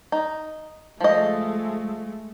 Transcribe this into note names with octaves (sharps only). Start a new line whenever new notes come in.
D#4
F3 G#3 A3 D#5